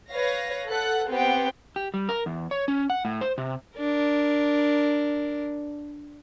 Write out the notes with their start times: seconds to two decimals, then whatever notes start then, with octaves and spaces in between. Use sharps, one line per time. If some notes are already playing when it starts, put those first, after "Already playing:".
0.10 B4 C#5 F5 A#6
0.67 A4 B4 F#5 F#6
1.09 B3 C4 G4 F#5 G5
1.76 G4
1.94 G3
2.09 A#4
2.26 E2
2.51 C#5
2.68 C#4
2.90 F#5
3.05 A2
3.21 C5
3.38 C3
3.78 D4 A#4